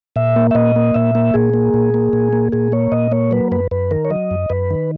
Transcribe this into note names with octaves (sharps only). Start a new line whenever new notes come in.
A#2 E5
A#3
E5
A#2 D#5
A#3
A#2 E5
A#3
A#2 G#4
A#3
A#2
A#3
A#2
A#3
A#2 G#4
A#3 C#5
A#2 D#5
A#3 C#5
F#3 B4
F#2 B4
F#2 B4
D#3 A#4
C#5
F#3 D#5
F#2
F#2 B4
D#3